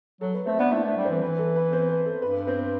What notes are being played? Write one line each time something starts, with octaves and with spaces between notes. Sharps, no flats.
F#3 A4
B4
A3 C4 C5
B3 D4 D5
A3 E4 E5
A3 D4 D5
G3
E3 C4 C5
E3 B4
A4
B4
C4 C5
B4
A4
G2 B4
C4 C5